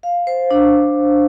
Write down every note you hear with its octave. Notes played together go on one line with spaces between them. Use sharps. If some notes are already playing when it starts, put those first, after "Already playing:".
F5
C5
D4